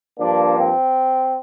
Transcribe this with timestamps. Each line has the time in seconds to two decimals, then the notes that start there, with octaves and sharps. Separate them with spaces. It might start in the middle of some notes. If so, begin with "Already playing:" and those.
0.18 G2 F3 A#3 D4
0.56 C4